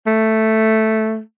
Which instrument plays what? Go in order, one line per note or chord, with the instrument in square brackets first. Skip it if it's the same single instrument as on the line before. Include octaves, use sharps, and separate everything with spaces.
[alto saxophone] A3